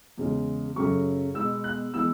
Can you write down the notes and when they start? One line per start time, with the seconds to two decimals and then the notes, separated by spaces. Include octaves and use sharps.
0.18 E2 C#3 G#3
0.76 F#2 C#3 F#3 A3 C#6
1.34 B2 G#3 B3 E6
1.64 F#6
1.94 E3 G#3 B3 E6